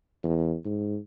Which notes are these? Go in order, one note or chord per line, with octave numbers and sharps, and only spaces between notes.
E2
G#2